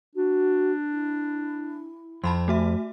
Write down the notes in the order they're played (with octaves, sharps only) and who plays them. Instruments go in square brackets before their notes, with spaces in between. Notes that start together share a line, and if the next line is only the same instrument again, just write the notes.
[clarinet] D4 [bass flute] F#4
[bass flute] E4
[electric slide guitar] F2 [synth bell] A5 B5 C6
[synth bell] A3 F#4 E5